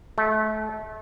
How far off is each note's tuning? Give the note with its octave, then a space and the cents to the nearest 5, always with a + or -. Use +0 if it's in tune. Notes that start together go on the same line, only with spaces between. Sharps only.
A3 -30